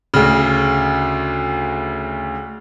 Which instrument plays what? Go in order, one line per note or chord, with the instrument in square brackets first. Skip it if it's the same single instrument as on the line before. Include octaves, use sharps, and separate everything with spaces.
[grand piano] D2 C#3